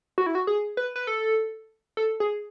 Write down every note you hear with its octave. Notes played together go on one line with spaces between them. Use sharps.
F#4
E4
F#4
G#4
B4
B4
A4
A4
G#4